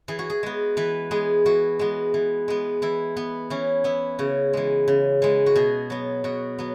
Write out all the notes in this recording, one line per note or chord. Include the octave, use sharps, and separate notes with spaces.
E3 G#4
F#4
G#4
G#3 B3
E3 B4
G#3 B3 G#4
E3 F#4
G#3 B3
E3
G#3 B3
E3 E4
B3
E3 C#4
B3 E4
C#3 F#4
E3 G#3
C#3
E3 G#3
F#4
B2 G#4
F#3 B3
B2 F#4
F#3 B3